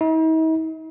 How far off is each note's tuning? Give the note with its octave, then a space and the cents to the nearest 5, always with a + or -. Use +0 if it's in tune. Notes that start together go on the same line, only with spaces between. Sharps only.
D#4 +45